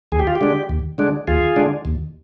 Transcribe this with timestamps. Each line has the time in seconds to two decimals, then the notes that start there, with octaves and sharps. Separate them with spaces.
0.12 D#2 G#4
0.19 G4
0.27 F4
0.36 G4
0.41 D3 G#3 D4
0.69 D#2
0.98 D3 G#3 D4
1.27 D#2 F4 G#4
1.56 D3 G#3 D4
1.85 D#2